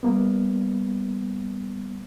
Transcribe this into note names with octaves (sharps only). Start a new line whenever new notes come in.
G3 A#3 B3